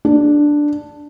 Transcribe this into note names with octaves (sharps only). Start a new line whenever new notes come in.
D4